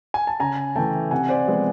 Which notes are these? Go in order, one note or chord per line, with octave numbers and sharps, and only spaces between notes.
G#5
A5
C#3 G#5 A#5
E3 A3 G5 A5
C3 F#5 G#5
C5 D5
F3 G#3 B3